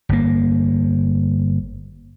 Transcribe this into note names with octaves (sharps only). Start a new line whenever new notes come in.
G1 A#3